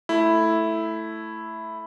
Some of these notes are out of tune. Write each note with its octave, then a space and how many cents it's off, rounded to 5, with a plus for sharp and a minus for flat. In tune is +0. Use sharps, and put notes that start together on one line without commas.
A3 +0 E4 +0